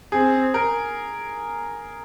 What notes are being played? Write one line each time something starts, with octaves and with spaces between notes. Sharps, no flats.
C4 G#4
A#4